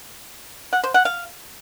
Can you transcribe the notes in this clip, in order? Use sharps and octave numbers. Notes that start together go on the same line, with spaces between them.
F#5
C5
F#5
F5